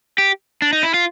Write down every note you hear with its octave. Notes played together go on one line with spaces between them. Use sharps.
G4
D4
D#4
E4
F4